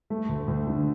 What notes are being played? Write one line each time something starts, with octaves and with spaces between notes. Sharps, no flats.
A3
D2
D2
D3